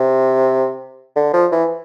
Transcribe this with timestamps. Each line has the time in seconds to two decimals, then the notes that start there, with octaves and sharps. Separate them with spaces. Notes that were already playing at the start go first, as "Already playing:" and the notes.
Already playing: C3
1.16 D3
1.33 F3
1.52 E3